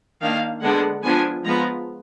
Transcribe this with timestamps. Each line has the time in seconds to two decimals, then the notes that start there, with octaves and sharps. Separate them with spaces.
0.21 D#3 A#3 D4 F5
0.62 D3 G#3 B3 D4 F#5
1.03 F3 B3 D4 G#5
1.45 F3 G#3 B3 A#5